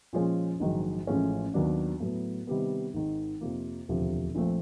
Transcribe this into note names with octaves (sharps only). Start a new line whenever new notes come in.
A#2 F3 G#3 C#4
A#1 G#2 D#3 F#3
A1 A2 F3 G#3 C#4
D#2 D#3 F#3 B3 D4
A2 F#3 B3
C3 D#3 G3 B3
G#1 G#2 D#3
F2 C3 F3 A#3
E1 D2 C3 F3
A#1 A#2 F3 A3 C4